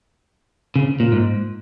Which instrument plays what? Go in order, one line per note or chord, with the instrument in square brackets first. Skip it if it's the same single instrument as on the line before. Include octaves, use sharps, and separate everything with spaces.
[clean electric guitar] C#3
A#2
G#2